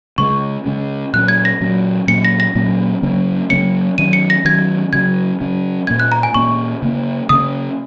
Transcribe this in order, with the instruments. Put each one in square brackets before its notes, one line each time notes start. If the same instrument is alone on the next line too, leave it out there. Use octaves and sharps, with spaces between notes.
[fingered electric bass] C#3 G#3 C#4 [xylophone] C#6
[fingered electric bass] C#3 G#3 C#4
[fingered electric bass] A#2 F#3 C#4 [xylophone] F#6
[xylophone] G#6
A#6
[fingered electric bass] A#2 F#3 C#4
[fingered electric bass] A#2 F#3 A#3 C#4 [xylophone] C#7
[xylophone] A#6
A#6
[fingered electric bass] A#2 F#3 A#3 C#4
C#3 F#3 A#3 C#4
[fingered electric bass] C#3 F#3 A#3 C#4 [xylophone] C#7
[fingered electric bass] D#3 F#3 C#4 [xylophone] D#7
[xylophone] C#7
A#6
[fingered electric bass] D#3 F#3 C#4 [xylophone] G#6
[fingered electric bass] C#3 F#3 C#4 [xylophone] G#6
[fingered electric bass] C#3 F#3 C#4
[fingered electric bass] A#2 A#3 C#4 [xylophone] G#6
[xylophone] F#6
A#5
G#5
[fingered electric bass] A#2 A#3 C#4 [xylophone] C#6
[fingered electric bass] C#3 A#3 C#4
[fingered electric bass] C#3 A#3 C#4 [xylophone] D#6